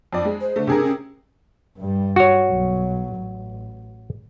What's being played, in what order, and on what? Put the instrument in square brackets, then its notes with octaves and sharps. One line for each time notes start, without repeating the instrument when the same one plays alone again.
[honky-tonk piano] F2 D5
G#3
[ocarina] C5
[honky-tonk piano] D3 A3
[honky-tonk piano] C3 G#4 A#4 [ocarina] D4
[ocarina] C#4
[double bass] G2 G3
[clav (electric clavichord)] F#4 C#5
[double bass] B1 F#3
A1